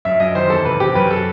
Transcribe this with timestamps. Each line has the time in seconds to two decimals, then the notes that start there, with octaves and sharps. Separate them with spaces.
0.05 F#2 E5
0.20 F#2 D#5
0.35 D#3 C5
0.50 E2 A4
0.65 C3 B4
0.80 C3 G4
0.95 F#2 B4
1.11 A4